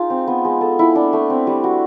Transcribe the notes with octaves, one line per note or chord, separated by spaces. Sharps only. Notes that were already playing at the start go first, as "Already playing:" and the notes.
Already playing: D#4 F4 G#4
C4
B3
G#3
A4
E4
D4
A3
C4
G3
F#4